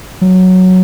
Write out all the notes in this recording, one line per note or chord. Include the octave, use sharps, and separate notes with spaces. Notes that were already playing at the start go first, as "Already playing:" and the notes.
F#3